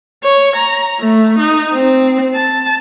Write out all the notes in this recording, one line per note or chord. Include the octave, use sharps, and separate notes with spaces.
C#5
A#5
A3
D#4
C4
A5